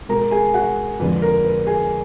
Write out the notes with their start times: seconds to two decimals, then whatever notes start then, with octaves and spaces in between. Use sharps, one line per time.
0.09 B2 G#3 A#4 A#5
0.31 G#4 G#5
0.54 F#4 F#5
0.99 F2 D3 G#3 B4
1.22 A#4
1.45 B4
1.67 G#4 G#5